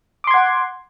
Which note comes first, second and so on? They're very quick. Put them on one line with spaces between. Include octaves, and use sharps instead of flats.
D6 C6 G#6 F#5